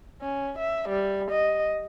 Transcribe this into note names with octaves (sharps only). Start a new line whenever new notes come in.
C#4
E5
G3
D#5